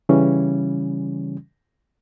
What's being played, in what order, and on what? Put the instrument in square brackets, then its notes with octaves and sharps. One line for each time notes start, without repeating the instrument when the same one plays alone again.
[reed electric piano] C#3 E3 G3 C#4